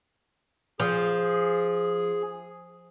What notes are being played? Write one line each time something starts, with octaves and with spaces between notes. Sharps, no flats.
F3 G#4